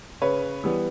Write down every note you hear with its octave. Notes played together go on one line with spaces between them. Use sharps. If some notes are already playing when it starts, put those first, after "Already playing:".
C#3 B4 C#5
E3 G3 B3